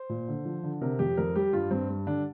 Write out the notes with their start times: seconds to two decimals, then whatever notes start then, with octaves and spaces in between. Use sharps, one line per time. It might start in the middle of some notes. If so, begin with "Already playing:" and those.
Already playing: C5
0.09 A#2
0.28 D3
0.45 F3
0.63 D3
0.81 C3 A#4
0.99 F2 G4
1.17 F2 A#4
1.35 G3 G4
1.53 G2 F4
1.71 G2 C4
1.89 G3
2.07 D3 D4